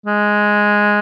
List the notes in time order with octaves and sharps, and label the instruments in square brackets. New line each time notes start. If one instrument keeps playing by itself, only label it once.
[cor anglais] G#3